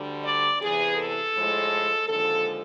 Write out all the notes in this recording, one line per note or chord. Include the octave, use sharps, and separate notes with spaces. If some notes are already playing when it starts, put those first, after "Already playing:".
Already playing: D2 D3 G3
D5
E2 C3 E3 G#4
A4
A2 F3 G#3
D#2 D3 F3 G#3 A4